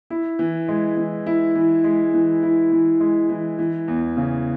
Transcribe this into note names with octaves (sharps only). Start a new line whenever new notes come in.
E4
E3
G#3
E3
E4
E3
G#3
E3
E4
E3
G#3
E3
E3
E2
C#3